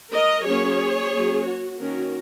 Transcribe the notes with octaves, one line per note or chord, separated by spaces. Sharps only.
A#4 D#5
F#3 A#3 C#4 G#4 C#5
F#3 A#3 C#4
F#4
D#3 A#3 C#4 F#4 A#4